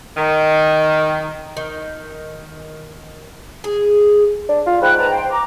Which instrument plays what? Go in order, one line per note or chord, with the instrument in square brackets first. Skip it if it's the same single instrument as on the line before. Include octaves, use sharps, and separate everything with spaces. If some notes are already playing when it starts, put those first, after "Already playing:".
[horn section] D#3
[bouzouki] D#3
G#4
[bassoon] D4
F4
[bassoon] G#2 [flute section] G5 B5 F#6
[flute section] B4 A5 A#5
C5 G5
A#5 D6